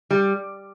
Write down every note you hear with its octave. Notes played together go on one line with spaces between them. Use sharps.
G3